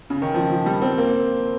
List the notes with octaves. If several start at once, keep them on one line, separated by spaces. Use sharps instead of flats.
C#3
D#3
F3
F3
G3
C4
A#3